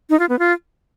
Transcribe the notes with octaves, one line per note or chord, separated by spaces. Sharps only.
D#4
F4
B3
F4